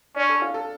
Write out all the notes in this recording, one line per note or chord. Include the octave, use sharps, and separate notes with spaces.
C#4 D4
A4
F4
A4